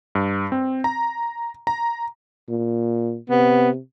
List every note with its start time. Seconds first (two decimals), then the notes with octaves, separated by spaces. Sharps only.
0.15 G2
0.52 C4
0.84 A#5
1.67 A#5
2.49 A#2
3.30 C3 B3